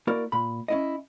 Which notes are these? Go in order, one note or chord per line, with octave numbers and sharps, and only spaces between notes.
A#3 E4 F#4 A#4 D5
A#2 B5
C#4 E4 D#5